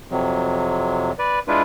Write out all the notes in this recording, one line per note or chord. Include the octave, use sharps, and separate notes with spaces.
F2 C3 F#3
B4 D5
G#3 D4 E4 F4 B4